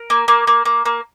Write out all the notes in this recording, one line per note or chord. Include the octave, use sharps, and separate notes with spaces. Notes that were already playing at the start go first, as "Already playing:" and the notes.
Already playing: A#4
A#3
A#3
A#3
A#3
A#3